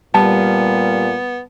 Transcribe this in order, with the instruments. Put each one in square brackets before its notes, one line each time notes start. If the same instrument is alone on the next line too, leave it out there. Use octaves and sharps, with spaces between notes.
[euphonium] A#2 [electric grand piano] G3 [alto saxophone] B3 [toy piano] A5